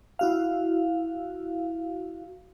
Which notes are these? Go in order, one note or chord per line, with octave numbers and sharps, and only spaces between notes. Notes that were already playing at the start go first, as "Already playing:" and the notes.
E4 F#4 F5